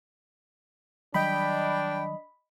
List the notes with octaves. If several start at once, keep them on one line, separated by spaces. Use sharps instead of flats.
D#3 F#3 G3 D4 D#5 G5 B5